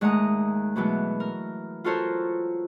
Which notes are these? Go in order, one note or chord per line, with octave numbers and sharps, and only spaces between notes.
D#2 G#3 A3 F#5 A#5 D#6
B2 E3 F#3 G#3 A3 B3
A#4
F4 F#4 A4 A#4 C5 C#5